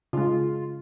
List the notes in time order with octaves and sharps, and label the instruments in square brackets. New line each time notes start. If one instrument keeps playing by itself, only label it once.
[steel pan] C#3 G#3 [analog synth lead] F4